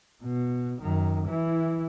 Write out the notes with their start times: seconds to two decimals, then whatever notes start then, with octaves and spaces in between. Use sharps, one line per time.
0.24 B2
0.82 F#2 D#3
1.27 E3 E4